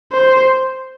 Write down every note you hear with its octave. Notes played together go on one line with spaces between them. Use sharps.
C5